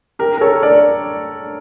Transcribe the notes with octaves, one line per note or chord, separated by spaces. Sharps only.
G4 A#4
A#4
A4 C#5
A#4 D5